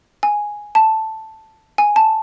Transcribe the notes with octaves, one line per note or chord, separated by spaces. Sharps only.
G#5
A5
G#5
A5